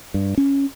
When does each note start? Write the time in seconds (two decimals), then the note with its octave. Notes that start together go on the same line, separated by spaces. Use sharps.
0.14 G2
0.38 C#4